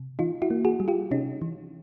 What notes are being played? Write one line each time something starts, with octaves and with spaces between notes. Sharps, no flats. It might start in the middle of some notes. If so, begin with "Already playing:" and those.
Already playing: C3
E3 D#4 F4
E4 F#4
A#3
F#4 G#4
G3
F4 G4
C3 C#4 D#4
E3